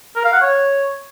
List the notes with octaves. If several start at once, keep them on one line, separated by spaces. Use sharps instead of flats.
A#4
F5
F#5
C#5